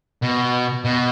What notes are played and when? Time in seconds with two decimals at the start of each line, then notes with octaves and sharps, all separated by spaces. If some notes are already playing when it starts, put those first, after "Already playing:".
0.22 B2
0.85 B2